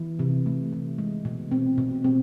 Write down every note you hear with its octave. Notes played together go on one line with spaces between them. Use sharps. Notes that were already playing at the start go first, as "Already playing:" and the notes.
Already playing: E3
C3
A3
C3
G#3
B2
C4
B2
C4